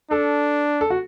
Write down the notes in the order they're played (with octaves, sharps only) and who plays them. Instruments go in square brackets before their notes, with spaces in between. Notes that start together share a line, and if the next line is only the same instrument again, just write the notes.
[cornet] D4 [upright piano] A4
[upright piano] A4
F#4